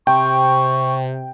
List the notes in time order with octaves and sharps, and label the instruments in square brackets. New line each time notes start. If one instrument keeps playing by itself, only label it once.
[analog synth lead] C3 [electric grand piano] G5 [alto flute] C#6